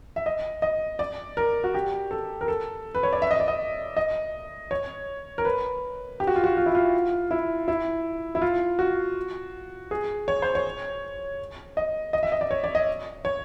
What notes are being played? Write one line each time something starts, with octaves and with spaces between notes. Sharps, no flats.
E5
D#5
D#5
D5
A#4
F#4
G4
A4
A#4
A4
B4
C#5
D5
E5
D#5
D5
D#5
D#5
C#5
A#4
B4
G4
F#4
F4
F#4
F4
E4
F4
E4
E4
E4
F4
F#4
G#4
C#5
C5
C#5
D#5
D#5
E5
D#5
D5
C#5
D5
D#5
C#5